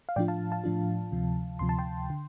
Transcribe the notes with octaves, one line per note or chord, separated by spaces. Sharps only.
F5
A2 F3 D4 F4 D5 G5
F5 A5
F5 A5
A2 F3 D4 F4
D2 C3 F3
D2 C3 F3 C6
A5
G5 C6
D3